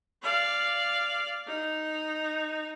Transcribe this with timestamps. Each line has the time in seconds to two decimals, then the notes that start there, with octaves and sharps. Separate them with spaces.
0.23 D5 F5
1.47 D#4